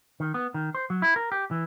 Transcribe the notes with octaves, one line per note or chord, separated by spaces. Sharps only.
D#3
B3
D#3
C5
F#3
E4
A#4
G4
E3